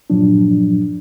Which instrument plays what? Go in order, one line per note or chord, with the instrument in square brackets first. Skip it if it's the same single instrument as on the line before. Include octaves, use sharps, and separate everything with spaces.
[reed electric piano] G2 A#2 F3 F#3 D4